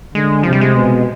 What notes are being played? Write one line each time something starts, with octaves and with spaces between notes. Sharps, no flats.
D3 G#3
C3 F3
G3
G#3
B2